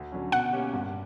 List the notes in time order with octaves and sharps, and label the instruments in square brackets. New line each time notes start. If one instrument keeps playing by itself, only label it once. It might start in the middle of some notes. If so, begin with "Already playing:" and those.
Already playing: [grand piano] D2
D3 F#3 C#4
[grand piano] B2 [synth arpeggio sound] F#5
[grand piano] A#3 C#4 G4
G2